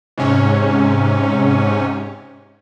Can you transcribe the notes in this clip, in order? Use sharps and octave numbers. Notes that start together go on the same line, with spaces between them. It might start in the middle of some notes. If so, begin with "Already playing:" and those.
G#2 C3 C#4